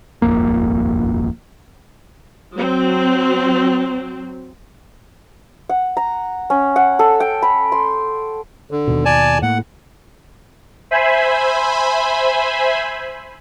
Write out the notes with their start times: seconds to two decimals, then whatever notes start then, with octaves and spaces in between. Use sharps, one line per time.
0.22 D#1 G#1 F2 A#3
2.54 F#3 C4
5.69 F#5
5.97 A#5
6.50 C#4
6.76 F#5
6.99 A4
7.20 G5
7.42 B5
7.72 C6
8.71 D3
8.87 D#2 B2
9.05 D5 G#5 A5
9.43 A2 A#3 F#5
10.91 C5 E5 G#5 B5